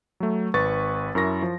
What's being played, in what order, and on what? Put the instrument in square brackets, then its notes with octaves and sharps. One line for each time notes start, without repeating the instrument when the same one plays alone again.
[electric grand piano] F#3 A3
G#1 B4 C#6 A6
F#2 E4 A#4 C#6 A#6
F3